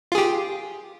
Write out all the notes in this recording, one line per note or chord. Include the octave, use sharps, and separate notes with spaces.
F4 G4 G#4